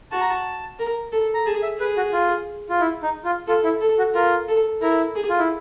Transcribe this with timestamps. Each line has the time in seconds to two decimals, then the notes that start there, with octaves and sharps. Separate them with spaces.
0.11 F#4 A5
0.21 A#5
0.30 A5
0.79 A#4
1.12 A4
1.34 A#5
1.46 G#4 A5
1.63 E5
1.79 G#4 B4
1.97 F#4
2.13 F4
2.69 F4
2.80 E4
3.03 D#4
3.25 F4
3.48 F4 A4
3.64 E4
3.81 A4
3.98 F#4
4.15 F4 A#4
4.48 A4
4.82 E4 A#4
5.15 G#4
5.29 F4
5.39 E4